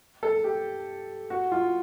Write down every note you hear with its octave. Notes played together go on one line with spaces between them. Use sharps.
A4
G4
F#4
F4